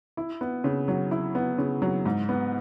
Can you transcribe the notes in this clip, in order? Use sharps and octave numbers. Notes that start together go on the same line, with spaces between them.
E4
B3
C#3
F#3
E4
B3
C#3
F#3
G#2
B3